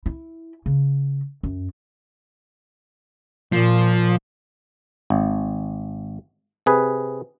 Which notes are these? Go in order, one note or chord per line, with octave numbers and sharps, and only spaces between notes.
E4
C#3
F#2
A#2 F3
G#1
C3 G#4 B4